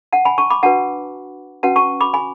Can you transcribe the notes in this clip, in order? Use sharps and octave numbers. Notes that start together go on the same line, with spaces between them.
F#5 A5
G#5 B5
A5 C#6
B5 D6
D4 F#4 B4 F#5 A5
C#4 F#4 B4 F#5 A5
A5 C#6
B5 D6
G#5 B5